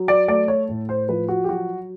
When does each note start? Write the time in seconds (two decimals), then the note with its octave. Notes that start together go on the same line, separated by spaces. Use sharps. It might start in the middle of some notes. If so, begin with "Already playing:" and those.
Already playing: F#3
0.08 D5
0.28 A3 D5
0.48 C#5
0.69 A2
0.89 C5
1.09 F3 B4
1.28 F#4
1.44 G4
1.49 F#3 F#4